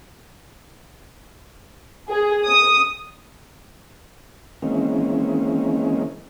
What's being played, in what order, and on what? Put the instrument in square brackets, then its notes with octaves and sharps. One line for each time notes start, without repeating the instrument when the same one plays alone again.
[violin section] G#4
D#6
[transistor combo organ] D#3 E3 G#3 A#3 C4 C#4